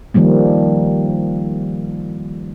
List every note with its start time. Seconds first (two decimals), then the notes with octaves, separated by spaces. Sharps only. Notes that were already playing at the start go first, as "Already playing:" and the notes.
0.14 D#3 F3 G3 A#3